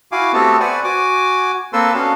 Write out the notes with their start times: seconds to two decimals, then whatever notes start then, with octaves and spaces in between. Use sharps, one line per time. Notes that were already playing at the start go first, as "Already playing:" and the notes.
0.12 E4 F#4 F5 G#5 D6
0.33 A3 B3 C4 F#4 G4 A4
0.60 B4 C5 D5 F#5 G#5 C#6
0.84 F#4 G#5 D6
1.73 A#3 C4 A4 B4 C6 E6
1.94 B3 C#4 D4 F#4 A4 F5